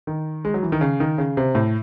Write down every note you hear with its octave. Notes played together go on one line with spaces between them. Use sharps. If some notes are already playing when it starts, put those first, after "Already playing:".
D#3
G#3
F#3
E3
D#3
C#3
D#3
C#3
C3
A2